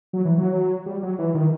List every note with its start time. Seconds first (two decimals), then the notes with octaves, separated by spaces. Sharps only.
0.13 F#3
0.25 E3
0.38 F#3
0.86 G3
1.03 F#3
1.19 E3
1.35 D#3